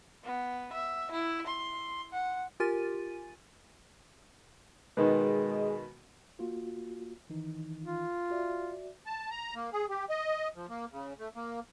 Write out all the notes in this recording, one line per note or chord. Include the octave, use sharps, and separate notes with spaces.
B3
E5
E4
C6
F#5
F4 G4 A#4 G#5 A6 D#7
B2 D#3 G#3 B3
A#3 F4 F#4
D#3 E3 D#4
F4
F#4 D5 E5
A5
A#5
A#3
G#4
G4
D#5
F3
A#3
C#3
A3
A#3